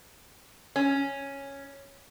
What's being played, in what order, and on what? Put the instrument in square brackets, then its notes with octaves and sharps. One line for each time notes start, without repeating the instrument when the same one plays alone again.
[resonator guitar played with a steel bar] C#4